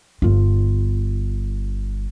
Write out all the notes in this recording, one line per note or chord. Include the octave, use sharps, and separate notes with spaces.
G1 F4